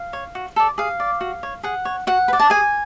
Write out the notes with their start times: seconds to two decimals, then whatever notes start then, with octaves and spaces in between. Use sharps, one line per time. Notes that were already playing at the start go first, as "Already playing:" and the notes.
Already playing: F5
0.13 C#5
0.35 F#4
0.56 A4 D5
0.78 G#4 F5
1.00 D5
1.21 F#4
1.43 C#5
1.63 G#4 F#5
1.85 C#5
2.07 F#4 F#5
2.28 B4
2.33 D5
2.40 A5
2.50 G#4 G#5